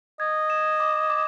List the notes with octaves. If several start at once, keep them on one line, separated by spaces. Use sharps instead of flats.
D#5 G#6
E7
D6
D6